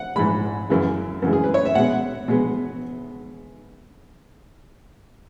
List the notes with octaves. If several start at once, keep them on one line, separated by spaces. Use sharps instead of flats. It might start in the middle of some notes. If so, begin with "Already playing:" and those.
Already playing: F#5
G#2 E3 G#3 B5
F#2 C#3 E3 G#3
F#2 C#3 E3 G#3
G#4
B4
C#5
E5
B2 G#3 B3 F#5
B2 G#3 B3